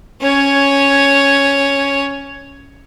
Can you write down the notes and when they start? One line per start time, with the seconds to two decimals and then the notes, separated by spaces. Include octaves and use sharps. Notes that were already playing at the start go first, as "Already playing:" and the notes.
0.21 C#4 C#5